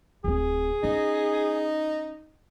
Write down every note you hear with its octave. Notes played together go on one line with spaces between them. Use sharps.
D1 C4 G#4
C#4 D#4